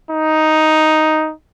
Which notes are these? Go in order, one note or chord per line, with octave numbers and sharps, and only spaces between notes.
D#4